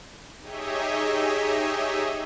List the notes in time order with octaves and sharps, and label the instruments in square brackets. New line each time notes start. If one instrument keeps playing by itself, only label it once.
[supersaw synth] D#4 G4 G#4 C#5 D#5 E5